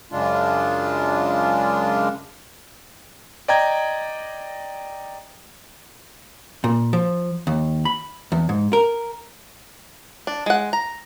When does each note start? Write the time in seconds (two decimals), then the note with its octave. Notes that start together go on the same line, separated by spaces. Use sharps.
0.12 F#2 C#3 G#3 D4 F4
3.48 D5 D#5 G5 A#5 G#6
6.64 A#2
6.93 F3
7.47 D#2
7.85 B5
8.32 E2
8.49 G#2
8.73 A#4
10.27 D4
10.46 G#3 F#5
10.73 A#5